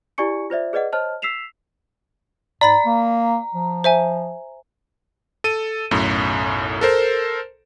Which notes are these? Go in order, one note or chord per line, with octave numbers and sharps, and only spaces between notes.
E4 G4 D5 G#5 C#6 C#7
F4 C5 D5 E5
G#4 B4 D5 D#5 F#5
C5 C#5 D#5 A5 F6
E6 B6 C7 E7 F7
G#2 D5 A#5 B5 A6
A#3
F3
C5 E5 G#5
A4 D#7
B1 F#2 A2
A4 A#4 C5